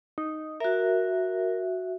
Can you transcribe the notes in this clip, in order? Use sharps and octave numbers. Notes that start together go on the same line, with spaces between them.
D#4
F#4 A#4 E5